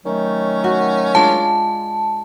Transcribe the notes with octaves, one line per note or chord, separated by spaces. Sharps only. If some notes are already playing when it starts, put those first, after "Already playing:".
D#3 F#3 A3 C#4
F#4
G#3 D4 F4 A5